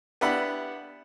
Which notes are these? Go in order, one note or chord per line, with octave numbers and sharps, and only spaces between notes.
B3 D4 E4 G4 F#5 B5